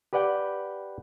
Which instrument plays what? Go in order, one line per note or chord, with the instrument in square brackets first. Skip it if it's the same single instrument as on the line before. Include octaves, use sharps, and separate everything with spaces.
[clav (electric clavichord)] G4 B4 D5 F#5 G5